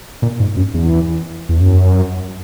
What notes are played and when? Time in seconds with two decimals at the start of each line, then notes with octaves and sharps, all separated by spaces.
0.22 A#2
0.40 G#2
0.56 F#2
0.74 E2
1.49 E2
1.60 F#2